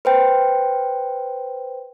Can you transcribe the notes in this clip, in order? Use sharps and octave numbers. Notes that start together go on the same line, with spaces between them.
B4 C5 G5